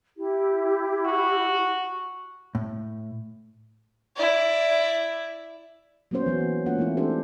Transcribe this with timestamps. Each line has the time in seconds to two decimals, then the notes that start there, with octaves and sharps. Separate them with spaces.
0.17 E4 G4
1.05 F#4
2.55 A2
4.16 E4 D5
6.11 F#3 A#3 B3 C#4 C5
6.26 E3 F#3 B3
6.40 A#3
6.66 G#3 A#3 C#4 F4 F#5
6.78 E3 A3 C4 E4
6.97 D4 F#4 G4 A4 C5